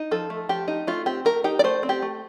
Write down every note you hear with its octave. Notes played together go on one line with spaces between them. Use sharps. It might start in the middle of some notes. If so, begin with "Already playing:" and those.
Already playing: D#4
F3 A4
A3
F3 G4
D#4
A3 F4
C4 G4
A3 A#4
D#4 G4
D5
A3 C5
C4
G4
A3